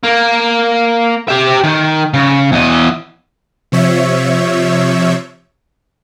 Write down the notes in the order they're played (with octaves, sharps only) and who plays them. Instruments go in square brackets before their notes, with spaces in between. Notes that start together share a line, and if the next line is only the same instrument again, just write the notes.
[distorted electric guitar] A#3
G4 E5
D#3
C#3
E2 D#5
[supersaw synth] C3 F3 C#5 E5